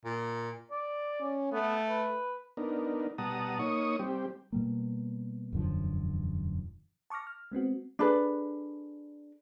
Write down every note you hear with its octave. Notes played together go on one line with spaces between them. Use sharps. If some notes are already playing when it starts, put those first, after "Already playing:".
A#2
D5
C#4
A3 B3
B4
B3 D4 D#4 A#4
B2 G3 F#5 A5 A#5 D#6
A#3 D#4 C#5 C#6 D#6
G3 C4 G4
B2 G3 A#3
E1 F#2 D3 F3
A5 C#6 D6 F6 A#6
F6
G#3 B3 C4 F#4
D4 G#4 A4 B4